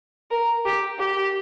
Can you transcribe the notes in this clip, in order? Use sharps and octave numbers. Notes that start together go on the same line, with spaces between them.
A#4
G4
G4